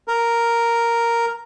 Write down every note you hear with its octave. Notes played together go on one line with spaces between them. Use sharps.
A#4